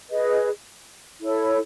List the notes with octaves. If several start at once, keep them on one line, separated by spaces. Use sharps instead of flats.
G#4 B4 D#5
E4 A4 C#5